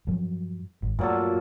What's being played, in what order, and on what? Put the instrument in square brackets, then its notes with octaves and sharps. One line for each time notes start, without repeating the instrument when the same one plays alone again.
[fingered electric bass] G2 F3 F#3
G#1
[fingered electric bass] G2 A3 [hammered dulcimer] A#2 F#3 A4